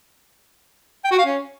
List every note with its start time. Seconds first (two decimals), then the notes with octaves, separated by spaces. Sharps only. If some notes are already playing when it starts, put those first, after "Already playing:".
1.04 G5
1.11 F#4
1.18 F5
1.25 C#4